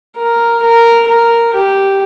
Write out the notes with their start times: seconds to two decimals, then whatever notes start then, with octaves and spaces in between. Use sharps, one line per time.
0.17 A#4
0.62 A#4
1.08 A#4
1.54 G4